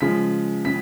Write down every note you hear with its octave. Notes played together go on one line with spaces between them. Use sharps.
C#3 F3 G#3 B6
C#3 B6